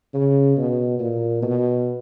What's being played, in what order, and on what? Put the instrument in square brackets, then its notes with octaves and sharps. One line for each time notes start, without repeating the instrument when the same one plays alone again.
[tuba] C#3
B2
A#2
B2